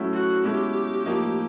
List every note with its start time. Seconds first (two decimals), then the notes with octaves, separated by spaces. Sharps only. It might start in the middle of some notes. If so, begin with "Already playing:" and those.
Already playing: A2 F#3 A3 C#4 E4
0.13 F#4
0.44 B2 G#3 C#4 E4 G4
1.06 A2 F3 A#3 D#4